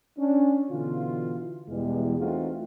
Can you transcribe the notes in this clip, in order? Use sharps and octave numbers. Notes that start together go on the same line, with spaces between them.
C#4 D4
B2 D3 E3 F4
E2 B2 E3 G3 G#3
E3 A3 C4 D#4 F4 F#4